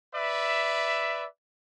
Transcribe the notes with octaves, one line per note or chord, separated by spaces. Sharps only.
B4 D5 E5